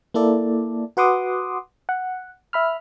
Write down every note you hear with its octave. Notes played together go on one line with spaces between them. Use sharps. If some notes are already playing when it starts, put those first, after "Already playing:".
A#3 E4 A4 D5
F#4 B4 F#5 C6 D6 D#6
F#5
E5 B5 F6